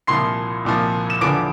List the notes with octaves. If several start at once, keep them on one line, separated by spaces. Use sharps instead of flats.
C2 A#2 F3 C6 C7
C2 A#2 F3
E7
E2 D3 F3 D6 D7